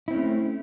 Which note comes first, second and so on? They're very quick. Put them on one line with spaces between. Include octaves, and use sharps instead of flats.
E4 C4 C#4 A3